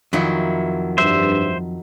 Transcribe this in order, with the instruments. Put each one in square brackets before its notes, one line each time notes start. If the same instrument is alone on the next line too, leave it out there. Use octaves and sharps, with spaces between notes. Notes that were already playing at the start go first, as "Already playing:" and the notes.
[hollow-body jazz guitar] F2 [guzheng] D#3 F#3 E4
[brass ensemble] G2 [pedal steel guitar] C5 E5